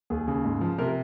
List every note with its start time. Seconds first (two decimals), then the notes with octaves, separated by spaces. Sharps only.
0.10 D#2 G#4
0.28 C#3
0.45 G#2
0.61 F3
0.78 C3 A#4